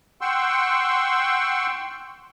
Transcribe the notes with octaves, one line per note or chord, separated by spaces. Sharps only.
F#5 G5 C6 C#6 E6